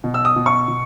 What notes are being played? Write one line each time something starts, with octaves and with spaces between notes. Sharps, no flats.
B2
E6
D#6
B2
C#6
B2